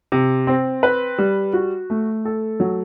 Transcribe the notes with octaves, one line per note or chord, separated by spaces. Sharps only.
C3
C4
B4
G3
F#4
A3
A4
F#3